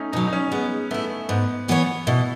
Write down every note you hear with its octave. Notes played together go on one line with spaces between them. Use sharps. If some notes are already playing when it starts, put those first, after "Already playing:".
Already playing: A3 C#4 D#4
B2 F#3 D#4
D#4
C#4
G#3 B3
A3 B3 E4
G#2 B3
E3 B3 F#4 C#5
B2 E4